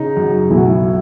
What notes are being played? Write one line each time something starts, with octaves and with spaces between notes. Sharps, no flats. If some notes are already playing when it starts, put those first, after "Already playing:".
Already playing: C#3 D#4
F#2
B1 E4
F#4
E4
B2